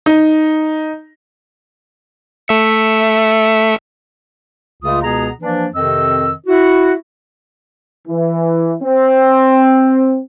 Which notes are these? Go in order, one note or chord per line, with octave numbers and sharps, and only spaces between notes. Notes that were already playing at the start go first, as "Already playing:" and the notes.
D#4
A3 E5 C#7
C#2 C#3 G#3 A3 F4 D#6
C#2 B2 B3 G#4 A#5
E3 F3 A#3 D4
F2 C3 D#3 C4 D#5 E6
E4 F#4
E3
C4